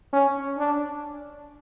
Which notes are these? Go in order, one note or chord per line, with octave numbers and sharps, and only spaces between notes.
C#4
D4